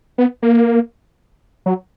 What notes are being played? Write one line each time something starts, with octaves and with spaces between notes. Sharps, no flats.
B3
A#3
F#3